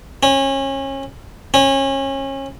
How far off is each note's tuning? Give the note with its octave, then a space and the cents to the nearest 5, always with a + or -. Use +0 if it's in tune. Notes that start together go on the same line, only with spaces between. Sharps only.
C#4 -30
C#4 -30